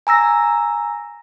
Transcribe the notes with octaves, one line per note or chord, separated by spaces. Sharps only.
G#5 A#5 E6 A#6